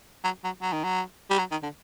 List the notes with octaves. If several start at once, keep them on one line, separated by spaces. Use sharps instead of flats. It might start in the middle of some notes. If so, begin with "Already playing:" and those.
F#3
F#3
F#3
D#3
F#3
G3
F#3
D#3
D3